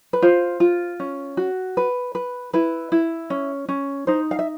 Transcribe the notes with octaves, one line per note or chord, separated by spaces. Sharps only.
B4
F4 C5
F4
C#4
F#4
B4
B4
E4 B4
E4
C#4
C#4
D#4 C5
F5
E5